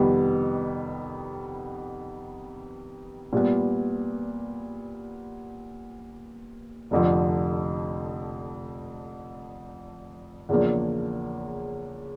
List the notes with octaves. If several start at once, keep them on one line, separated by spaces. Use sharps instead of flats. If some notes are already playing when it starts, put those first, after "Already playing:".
Already playing: F2 C3 D#3 G3 B3
A#2 G3 B3
F1 F2 D3 F3
E2 C#3 F3 A#3 D4